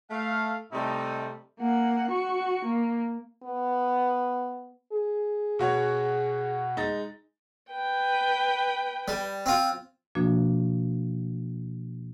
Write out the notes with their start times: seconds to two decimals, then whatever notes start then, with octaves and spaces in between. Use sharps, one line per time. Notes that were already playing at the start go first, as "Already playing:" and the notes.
0.11 A3 F5
0.72 A2 C3 G3 A3 D#4
1.59 A#3 F#5
2.11 F#4 C#6
2.65 A#3
3.43 B3
4.92 G#4
5.59 B2 F#4 C#5
6.77 G#3 D#4 A6
7.71 B4 G5
9.08 G3
9.46 C4 F4
10.15 B2 F3 A#3 D4 F#4